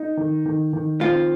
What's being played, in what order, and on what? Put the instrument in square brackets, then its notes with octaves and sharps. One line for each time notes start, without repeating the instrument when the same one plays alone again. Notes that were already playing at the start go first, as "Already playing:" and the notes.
Already playing: [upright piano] D#4
D#3
D#3
D#3
[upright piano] C4 [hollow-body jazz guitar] F4